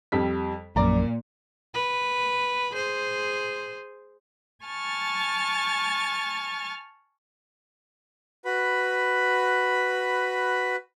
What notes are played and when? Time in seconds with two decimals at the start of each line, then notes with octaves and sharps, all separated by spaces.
0.12 F2 G3 B6
0.76 A#1 F#2 A#2 D5 A#5
1.74 B4
2.73 G#4 C5
4.64 G#5 A5 C#6 F6 A6
8.45 F#4 B4 B5